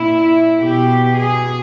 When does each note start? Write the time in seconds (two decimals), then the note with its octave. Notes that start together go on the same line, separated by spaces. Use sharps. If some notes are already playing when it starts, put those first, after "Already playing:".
Already playing: A#2 E4
0.60 B2 G4
1.16 G#4